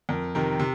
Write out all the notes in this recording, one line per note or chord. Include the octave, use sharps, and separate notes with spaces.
F2 A#4
C3 D#3 A#4
C3